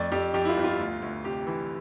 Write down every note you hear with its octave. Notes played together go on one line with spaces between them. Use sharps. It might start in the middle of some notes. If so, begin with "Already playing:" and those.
Already playing: F2 A3 D5
F2 G4
F2 G4
E4
F4
G1
F4
D2
D2
C3 G4
E3